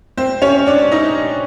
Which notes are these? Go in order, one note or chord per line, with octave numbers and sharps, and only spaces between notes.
C4 C5
C#4 C#5
D4 D5
D#4 D#5